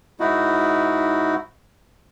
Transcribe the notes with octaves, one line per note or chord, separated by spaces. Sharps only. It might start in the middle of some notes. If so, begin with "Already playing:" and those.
G#2 D#4 E4 F#4